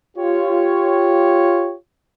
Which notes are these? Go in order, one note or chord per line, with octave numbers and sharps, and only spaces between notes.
F4 G4 C#5